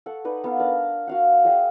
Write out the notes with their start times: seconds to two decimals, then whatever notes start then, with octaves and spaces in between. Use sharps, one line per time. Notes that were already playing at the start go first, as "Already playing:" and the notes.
0.06 A4 F#5 C#6
0.25 D#4 B4 D5
0.44 B3 A4 F5
0.59 D4 A#4 D5
1.07 F#4 F5 F#5
1.45 G#4 D5 D#5 G5